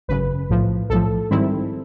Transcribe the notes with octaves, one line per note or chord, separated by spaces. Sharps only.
G#1 F#2 C#3 B4
B1 A2 F3
B1 A2 F3 A4
G#2 D#3 G3 C4 E4